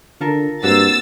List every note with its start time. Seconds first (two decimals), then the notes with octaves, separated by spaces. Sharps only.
0.21 D3 F4 A4 A#4
0.64 G2 A#3 C4 F#4 E6 A6